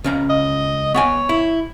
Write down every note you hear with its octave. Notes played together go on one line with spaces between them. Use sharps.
C#2 C#4 A#5
D#5
B3 C#5 F#5 G#5
E4